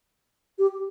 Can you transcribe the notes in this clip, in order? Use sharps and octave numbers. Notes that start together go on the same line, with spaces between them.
G4